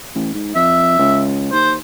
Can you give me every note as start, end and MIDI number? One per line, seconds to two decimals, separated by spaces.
0.15 0.30 33
0.34 0.51 44
0.55 0.94 41
0.55 1.24 76
0.99 1.47 37
1.52 1.77 39
1.52 1.73 72